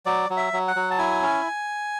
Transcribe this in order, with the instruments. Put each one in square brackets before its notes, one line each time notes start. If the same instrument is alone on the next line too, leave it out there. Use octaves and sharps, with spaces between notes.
[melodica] F#3 D5
F#3
E5
F#3
F#5
F#3
A5
E4 G#5
C#4